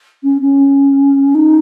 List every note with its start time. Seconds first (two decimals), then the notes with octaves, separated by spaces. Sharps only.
0.23 C#4
0.41 C#4
1.35 D#4